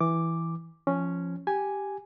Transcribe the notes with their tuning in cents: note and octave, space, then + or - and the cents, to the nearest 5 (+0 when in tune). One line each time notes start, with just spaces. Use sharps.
E3 +0 D6 +0
F3 -10 C#4 +0
G4 +0 G#5 +0